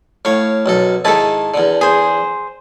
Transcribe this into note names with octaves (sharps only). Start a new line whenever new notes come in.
A2 C#5 F5
B1 F#2 A4
G#2 D#3 E4 A4 A5
E2 D3
G#4 C5